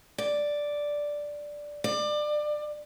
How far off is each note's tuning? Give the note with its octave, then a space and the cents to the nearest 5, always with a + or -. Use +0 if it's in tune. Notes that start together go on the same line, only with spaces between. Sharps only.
D5 +0
D5 +25